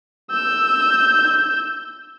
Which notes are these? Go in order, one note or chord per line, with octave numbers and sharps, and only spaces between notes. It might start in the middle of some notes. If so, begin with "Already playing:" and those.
E6 G6